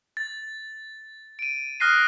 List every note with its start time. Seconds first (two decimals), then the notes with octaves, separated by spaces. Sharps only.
0.17 A6
1.39 D7 D#7
1.80 D#6 F6 F#6 A#6 C7 D#7